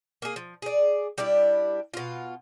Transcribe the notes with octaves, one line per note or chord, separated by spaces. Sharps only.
A#3 G#4
F3
G#4 D5
G3 D4 E4 G4
B2 F4